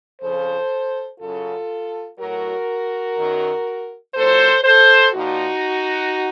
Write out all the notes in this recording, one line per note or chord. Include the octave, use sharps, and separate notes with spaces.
F2 C#3 F3 A4 C5
F#2 C#3 F#3 F4 A4
A2 F#3 F#4 A#4
F#2 D#3 F#3
A#2 F#3 A4 C5
A4 C5
A#2 F3 D#4 F#4